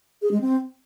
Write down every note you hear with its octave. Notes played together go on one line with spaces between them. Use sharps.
G#4
G#3
C4